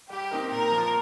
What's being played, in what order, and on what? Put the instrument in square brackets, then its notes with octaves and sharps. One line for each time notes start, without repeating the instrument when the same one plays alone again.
[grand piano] G3 [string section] G4
[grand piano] C4 D#4 A#4
[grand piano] A#2 [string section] A#4
[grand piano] F3 A#3 F4